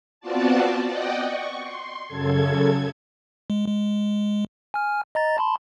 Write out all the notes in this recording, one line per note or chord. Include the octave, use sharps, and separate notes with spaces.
B3 C4 F4 F#4 D5 A5
D5 D#5 F#5 G5
C#6
C6
F#2 C#3 A4 G#6
G#3
G#3
G#5 F6
D#5 A#5 A6
A5 B5 C6